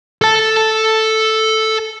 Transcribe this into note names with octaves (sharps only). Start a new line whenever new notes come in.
A4 A5